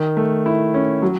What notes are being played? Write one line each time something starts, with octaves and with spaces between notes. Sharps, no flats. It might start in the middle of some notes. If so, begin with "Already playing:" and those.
Already playing: D#3
A3
E4
C#4
F#3